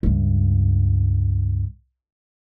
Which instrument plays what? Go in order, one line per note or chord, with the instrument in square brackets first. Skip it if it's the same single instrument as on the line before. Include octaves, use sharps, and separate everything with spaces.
[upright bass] C#2 G2